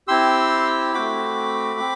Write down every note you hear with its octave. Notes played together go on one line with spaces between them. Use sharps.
C4 E4 G4 C6 E6
A3 C4 F#4 B5 D6
C4